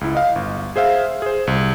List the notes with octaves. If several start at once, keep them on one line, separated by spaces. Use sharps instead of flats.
C#2 E4
D#5 F5
G1
G#4 C5 E5 F5
G#4 C5
C2